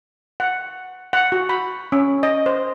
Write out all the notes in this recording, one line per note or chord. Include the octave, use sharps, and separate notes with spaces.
F#5
F#5
F#4
B5
C#4
D#5
C5